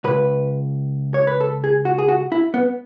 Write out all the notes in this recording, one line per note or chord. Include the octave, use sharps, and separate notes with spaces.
C#2 B2 B4
C#5
B4
A4
G#4
F#4
G#4
F#4
E4
B3